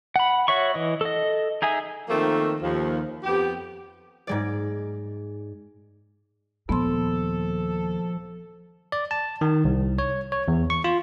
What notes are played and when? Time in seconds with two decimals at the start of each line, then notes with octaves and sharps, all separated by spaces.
0.16 F#5 B5
0.48 F#4 C#5 E5 C#6
0.74 E3 D#5
1.01 A4 D#5
1.62 D#4 G#4 E5 G#5
2.09 D#3 F3 A3 A#3 C4
2.61 D#2 F3
3.24 F2 B3 G4
4.27 G#2 G#3 D5
6.69 D#2 A#2 F3 B3 A4 C6
8.92 D5
9.11 A5
9.41 D#3
9.65 C2
9.99 C#5
10.32 C#5
10.48 E2
10.70 C#6
10.84 F4